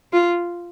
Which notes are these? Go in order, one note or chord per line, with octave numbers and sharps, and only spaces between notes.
F4